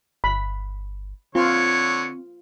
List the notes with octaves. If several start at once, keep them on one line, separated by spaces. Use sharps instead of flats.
G1 B5
D3 C4 F4 C#5